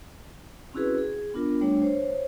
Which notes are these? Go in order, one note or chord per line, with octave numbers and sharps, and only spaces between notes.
C4 C#4 E4 F#4 G#4 B4
G#4
B3 D4 F4 A#4
G3 A3 D4 C#5
C5 C#5